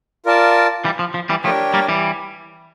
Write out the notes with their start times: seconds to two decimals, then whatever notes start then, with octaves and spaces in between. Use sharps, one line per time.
0.26 F4 A#4 D5 A5
0.85 E3 G3
0.99 F3
1.14 F3
1.29 E3 G3
1.44 F3 A3 D4 G4 A#4 C#5 G5
1.74 G3 A#3
1.88 E3 G3